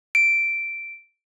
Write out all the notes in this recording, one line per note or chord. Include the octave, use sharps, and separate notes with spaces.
D7